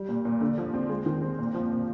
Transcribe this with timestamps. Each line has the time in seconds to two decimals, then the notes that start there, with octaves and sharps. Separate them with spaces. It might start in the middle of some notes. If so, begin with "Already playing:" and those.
Already playing: G3
0.09 A#2
0.25 A#2
0.41 D3
0.58 F3
0.74 C4
0.90 G#3
1.06 D#3
1.22 C4
1.38 A#2
1.54 F3
1.71 A#2